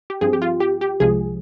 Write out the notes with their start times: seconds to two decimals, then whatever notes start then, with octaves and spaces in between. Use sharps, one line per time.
0.10 G4
0.21 G2 F3 C4 G#4
0.33 G4
0.42 F4
0.60 G4
0.81 G4
1.00 C2 C3 F3 G#3 G#4